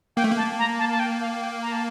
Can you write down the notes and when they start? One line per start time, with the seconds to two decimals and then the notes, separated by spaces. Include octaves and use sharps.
0.17 A#3 G5
0.24 A3
0.31 A#3
0.37 A5
0.59 A#5
0.79 A5
0.91 A5
1.00 G5
1.20 F5
1.41 G5
1.62 A#5
1.72 A5